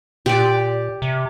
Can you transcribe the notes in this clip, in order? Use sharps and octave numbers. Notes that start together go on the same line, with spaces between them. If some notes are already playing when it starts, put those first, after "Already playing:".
A#2 G4 D5
C3